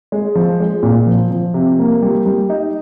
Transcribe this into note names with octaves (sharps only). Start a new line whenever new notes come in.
G#3
F3
G#3
A#2
F3
F3
C3
A#3
G3
G3
D#4